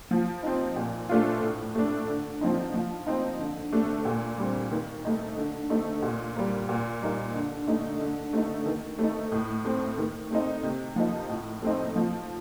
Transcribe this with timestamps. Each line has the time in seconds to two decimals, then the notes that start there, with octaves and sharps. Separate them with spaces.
0.11 F3
0.43 C4 D#4
0.76 A#2
1.09 A3 D4 F4
1.42 A2
1.75 A3 D4
2.08 D3
2.41 F3 C4 D#4
2.74 F3
3.06 C4 D#4
3.39 D3
3.72 A3 D4
4.05 A#2
4.38 G3 C4
4.71 D#3
5.05 A3 D#4
5.36 D3
5.70 A3 D#4
6.02 A#2
6.36 G3 A#3
6.69 A#2
7.01 G3 A#3 D#4
7.34 D3
7.67 A3 D#4
8.01 D3
8.33 A3 D#4
8.66 D#3
8.99 A3 D#4
9.32 A2
9.64 A3 C4
9.98 D#3
10.31 A3 C4 D#4
10.63 C3
10.96 F3 A#3 D#4
11.29 A2
11.62 A3 C4 D#4
11.96 F3